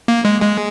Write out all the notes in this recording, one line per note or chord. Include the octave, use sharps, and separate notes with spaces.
A#3
G#3
G#3